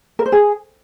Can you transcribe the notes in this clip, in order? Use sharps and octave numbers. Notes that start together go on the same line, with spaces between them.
A#4
C5
G#4